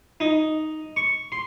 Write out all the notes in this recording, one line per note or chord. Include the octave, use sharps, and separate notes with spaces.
D#4
C#6
C6